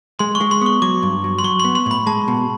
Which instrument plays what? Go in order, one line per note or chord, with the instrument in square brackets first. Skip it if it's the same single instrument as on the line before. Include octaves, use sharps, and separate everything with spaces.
[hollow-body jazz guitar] G#3 [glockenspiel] C6
[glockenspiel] C#6
[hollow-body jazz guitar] G#3
[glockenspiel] C6
[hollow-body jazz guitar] B3 [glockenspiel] C#6
[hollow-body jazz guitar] F#3 [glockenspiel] D6
[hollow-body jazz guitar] G2
F#3
[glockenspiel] C6
[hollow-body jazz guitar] F#3 [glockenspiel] C#6
[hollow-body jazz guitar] B3 [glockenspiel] C6
[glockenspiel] C6
[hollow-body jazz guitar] A2 [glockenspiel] B5
[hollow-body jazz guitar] G#3 [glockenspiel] A5
[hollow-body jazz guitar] B2